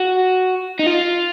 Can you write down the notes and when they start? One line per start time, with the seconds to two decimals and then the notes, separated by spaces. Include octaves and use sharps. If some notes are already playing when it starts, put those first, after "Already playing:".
Already playing: F#4
0.79 D#4
0.86 F4